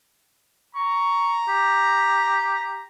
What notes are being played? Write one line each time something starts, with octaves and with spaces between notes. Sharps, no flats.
A#5 C#6
G4